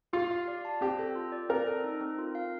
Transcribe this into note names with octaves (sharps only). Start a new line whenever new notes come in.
F4 G4
F5
D5
A5
C4 G4
A4
F4
D5
C4 A#4
A4
D#4
C4
F4
F5